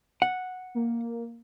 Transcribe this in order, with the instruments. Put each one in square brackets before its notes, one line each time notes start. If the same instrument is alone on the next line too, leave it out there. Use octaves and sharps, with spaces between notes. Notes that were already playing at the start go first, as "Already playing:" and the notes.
[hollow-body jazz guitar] F#5
[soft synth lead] A#3